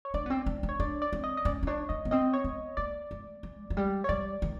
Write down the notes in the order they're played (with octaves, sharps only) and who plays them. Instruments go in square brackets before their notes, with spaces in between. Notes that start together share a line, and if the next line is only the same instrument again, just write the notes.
[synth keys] C#5
[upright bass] D4 [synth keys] D5
[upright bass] B3
C4
D4
D4
[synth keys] C#5
[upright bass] D4 [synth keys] D5
[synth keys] D5
[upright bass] C4
[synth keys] D#5
D#5
[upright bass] C#4 [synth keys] D5
[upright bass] C#4
[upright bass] D4 [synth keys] C#5
[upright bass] D4 [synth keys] D#5
[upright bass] B3
[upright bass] C4 [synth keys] D#5
[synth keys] C#5
[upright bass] B3
[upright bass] A#3 [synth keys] D5
[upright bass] A3
G#3
F#3
G3
[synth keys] C#5
[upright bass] G3 [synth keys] D5
[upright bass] D#3